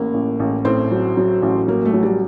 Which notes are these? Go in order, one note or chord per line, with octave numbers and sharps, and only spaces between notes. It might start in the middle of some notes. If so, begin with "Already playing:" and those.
Already playing: A1 A2 A#3
A1
A1
A2 C4
F#3
F#3
A1
F#3 A#3
A3
F#3
G3